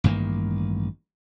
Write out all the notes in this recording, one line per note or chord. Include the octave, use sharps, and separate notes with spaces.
A1 G2 D#3 A#3